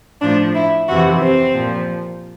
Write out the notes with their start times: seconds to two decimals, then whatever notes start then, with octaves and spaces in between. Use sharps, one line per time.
0.21 A2 F3 D4
0.55 E4
0.88 F2 C3 E3 F#4
1.22 C4
1.54 A#2 F3